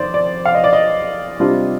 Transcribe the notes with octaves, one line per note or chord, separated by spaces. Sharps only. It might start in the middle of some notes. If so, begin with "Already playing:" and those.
Already playing: F2 D#3 C5 D5
D5
F5
D#5
D5
D#5
C3 G3 D4 F4